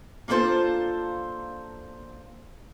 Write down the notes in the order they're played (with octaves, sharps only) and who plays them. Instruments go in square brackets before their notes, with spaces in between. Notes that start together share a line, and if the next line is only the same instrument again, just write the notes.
[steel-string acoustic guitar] A#3 D4 F4 A4 C5 A5